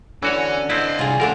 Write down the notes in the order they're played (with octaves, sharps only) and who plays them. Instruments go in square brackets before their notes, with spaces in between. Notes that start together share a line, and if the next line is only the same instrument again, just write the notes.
[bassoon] D3 [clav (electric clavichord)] E3 F#4 C#5 [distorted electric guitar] C#4
[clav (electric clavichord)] C4 E4 [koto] B4 [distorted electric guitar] D5 D#5
[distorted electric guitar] C2 [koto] F4 G#4
[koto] D3 A3 D4 [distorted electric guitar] D#3 G3 [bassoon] F#4 [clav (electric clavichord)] A#4